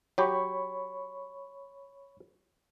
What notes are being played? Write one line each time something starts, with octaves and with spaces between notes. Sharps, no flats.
F#3 G4 C#5 B5 C#6